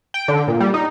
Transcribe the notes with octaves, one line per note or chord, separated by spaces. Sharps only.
G5
D3
A#2
G3
D#4